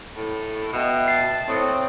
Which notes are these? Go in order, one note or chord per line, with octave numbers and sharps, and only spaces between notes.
A2
B2 D#5 E5 G5
A5 C7
A2 C4 C#5 D#6 F#6